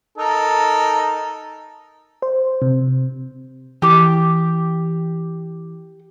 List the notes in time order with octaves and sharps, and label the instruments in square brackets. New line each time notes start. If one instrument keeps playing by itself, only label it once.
[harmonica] D#4 A4 A#4
[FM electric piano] C5
C3
[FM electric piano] E3 [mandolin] G4 D6